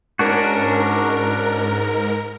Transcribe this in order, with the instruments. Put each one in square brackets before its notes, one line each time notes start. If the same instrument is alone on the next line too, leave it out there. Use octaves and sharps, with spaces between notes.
[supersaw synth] G#2 A#4 [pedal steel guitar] C#4 D4 F#4